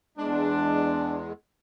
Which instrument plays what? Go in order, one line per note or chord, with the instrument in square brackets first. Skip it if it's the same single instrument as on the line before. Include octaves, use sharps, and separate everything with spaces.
[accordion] E2 G#3 [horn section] D4